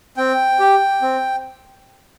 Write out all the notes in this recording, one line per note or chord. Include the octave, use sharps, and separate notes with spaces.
C4 G5
G4
C4